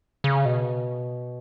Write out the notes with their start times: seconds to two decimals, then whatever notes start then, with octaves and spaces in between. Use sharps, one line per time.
0.24 C#3
0.45 B2